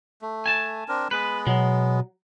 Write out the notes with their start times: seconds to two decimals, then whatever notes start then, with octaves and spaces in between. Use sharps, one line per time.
0.22 A3
0.46 G#5 A5
0.88 C4 D4 A#4
1.11 G#3 B3 B4
1.47 B2 F#3